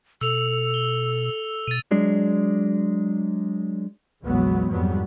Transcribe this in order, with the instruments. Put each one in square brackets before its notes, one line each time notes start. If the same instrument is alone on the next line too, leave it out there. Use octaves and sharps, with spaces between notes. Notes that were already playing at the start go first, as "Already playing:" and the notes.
[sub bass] B2 [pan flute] A4 [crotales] E6 F7
[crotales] G7
[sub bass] B2 [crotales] A6 D#7
[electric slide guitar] F#3 G#3 D4
[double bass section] A#1 E2 F#3 G#3 B3
F2 G#2 F#3 G3 B3